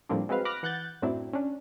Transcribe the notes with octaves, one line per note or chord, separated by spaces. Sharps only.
A2 F3 G3 A#3 C4 D4
G#3 C4 F#4 B4 F5
B5 D6 F6 F#6 A#6
E3 F#5 F#6 G6 A6
F#2 A2 F#3 C4 D4 E4
C#4 D4